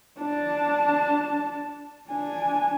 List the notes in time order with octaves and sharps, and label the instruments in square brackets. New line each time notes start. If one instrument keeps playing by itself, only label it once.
[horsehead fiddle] D4 A5
D4 G#5